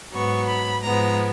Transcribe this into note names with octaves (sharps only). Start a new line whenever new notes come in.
G#2 F#3 B3 C#6
B5
G#2 F3 G#3 B3 A#5